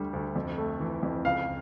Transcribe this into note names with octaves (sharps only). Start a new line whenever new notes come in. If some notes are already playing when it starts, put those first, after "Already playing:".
Already playing: D2 D3 G3
D2
F2
A3
E3
F2
C#2 F5